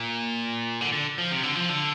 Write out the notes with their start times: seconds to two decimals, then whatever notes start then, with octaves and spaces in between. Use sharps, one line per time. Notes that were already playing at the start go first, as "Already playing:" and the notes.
Already playing: A#2
0.81 D3
0.92 D3
1.18 F3
1.31 C3
1.43 D3
1.56 F3
1.69 D3